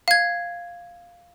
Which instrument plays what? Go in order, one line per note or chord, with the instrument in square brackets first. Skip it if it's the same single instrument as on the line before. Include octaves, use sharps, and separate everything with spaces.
[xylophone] F5 G#6